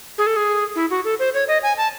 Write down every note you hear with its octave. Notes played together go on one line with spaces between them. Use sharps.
G#4
A4
G#4
E4
F#4
A4
C5
C#5
D#5
G#5
A5